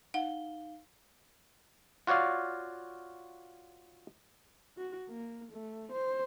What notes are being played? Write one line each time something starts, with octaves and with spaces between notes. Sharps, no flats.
D#4 F5 F#5 G7
F4 F#4 C#5 D5 F5
F#4
A#3
A3
C5